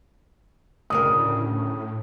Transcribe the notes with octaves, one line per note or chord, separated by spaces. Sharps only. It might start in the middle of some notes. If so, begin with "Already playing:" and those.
D2 C#3 A#4 D#6
A2